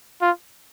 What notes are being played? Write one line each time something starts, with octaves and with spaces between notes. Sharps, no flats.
F4